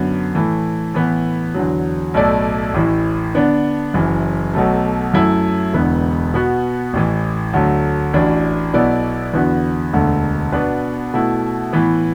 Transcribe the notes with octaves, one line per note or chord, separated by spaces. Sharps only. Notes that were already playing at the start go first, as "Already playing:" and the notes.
Already playing: F#2 D3 B3
A2 E3 A3
A2 E3 B3
E2 D3 F#3
B1 A2 A3 E4 D5
A1 A2 E3
D3 B3 D4
F#1 F#2 E3
B1 B2 F#3 A3
F#2 F#3 A3 E4
E1 E2 D3 B3
B2 B3 F#4
A1 A2 E3
D2 D3 F#3 A3
A1 A2 E3 D4 F#4
B1 B2 B3 E4 D5
E2 D3 B3 F#4
E1 D2 D3 A3
B2 B3 D4 B4
B2 A3 E4
A2 E3 B3